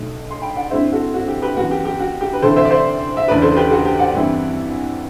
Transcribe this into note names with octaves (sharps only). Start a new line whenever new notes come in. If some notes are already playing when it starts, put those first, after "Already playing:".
Already playing: B1 B2 A3
C6
G5 B5
D5 F#5
G2 D3 A3 C4 E4 C5 E5
F#4 A4
F#4
G4
G4 B4
F#2 E3 B3 F#4
G4
G4
F#4
G4
B4
D2 C3 E3 A4 C5
C5 E5
D5
C5 E5
E5
F#1 E2 D3 A3 B4 D5
A4 C5
G4 B4
F#4 A4
G4
D5 F#5
G2 E3 G3 C4 E4